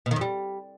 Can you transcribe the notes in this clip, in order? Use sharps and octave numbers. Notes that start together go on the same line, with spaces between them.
B2
D#3
F2
G3